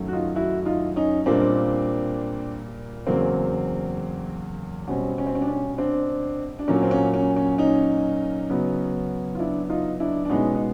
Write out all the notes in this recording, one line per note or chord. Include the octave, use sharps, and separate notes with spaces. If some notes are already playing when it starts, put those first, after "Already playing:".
Already playing: F#2 D#3 F#3 A3
F#4
D#4 F4
E4 F#4
D#4 F4
C#4 D#4
A#2 G3 A#3 C4 D4
E2 C#3 F#3 A#3 C4
B2 G3 C4 C#4
C#4
C4
C#4
D4
C#4
C4 D4
D4
A#2 F#3 A#3 C#4
C4
C#4
C#4
C#4
C#4 D#4
C#3 F#3 B3
F4
D4 E4
D#4 F4
D4 E4
D4
B2 G#3 B3 C#4 D#4
D#4